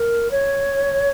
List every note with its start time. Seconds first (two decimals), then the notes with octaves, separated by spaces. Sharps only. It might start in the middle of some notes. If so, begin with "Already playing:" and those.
Already playing: A#4
0.31 C#5